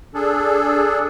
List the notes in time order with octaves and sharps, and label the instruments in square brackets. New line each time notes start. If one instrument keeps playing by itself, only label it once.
[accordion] D4 G#4 A4